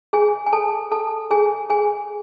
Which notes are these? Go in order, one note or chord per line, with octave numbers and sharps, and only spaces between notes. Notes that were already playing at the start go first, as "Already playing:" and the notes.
G#4 G#5
G#5
A4 A5
A4 A5
G#4 G#5
G#4 G#5